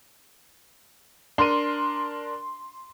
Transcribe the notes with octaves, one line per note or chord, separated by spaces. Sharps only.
D4 A#4 C6 D#7